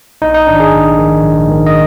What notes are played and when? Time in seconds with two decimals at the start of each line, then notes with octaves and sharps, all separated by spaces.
0.22 A#1 D#4
0.34 D#4
0.47 G#2 D#3 D4
0.60 G#4
0.71 A#1
0.98 G#2 D#3
1.22 A#1
1.48 G#2 D#3
1.67 D#5